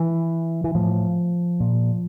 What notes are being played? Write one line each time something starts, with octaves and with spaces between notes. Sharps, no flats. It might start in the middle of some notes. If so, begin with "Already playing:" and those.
Already playing: E3
E3
A2 F3
A#2